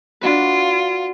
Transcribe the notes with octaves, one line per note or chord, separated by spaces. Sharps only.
D4 F4 F#4 B4